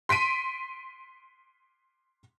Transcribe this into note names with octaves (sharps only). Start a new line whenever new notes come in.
C6 B6 D7 D#7